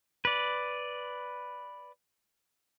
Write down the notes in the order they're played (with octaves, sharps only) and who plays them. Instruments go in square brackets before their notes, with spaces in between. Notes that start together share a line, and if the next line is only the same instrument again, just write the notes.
[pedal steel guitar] B4 D5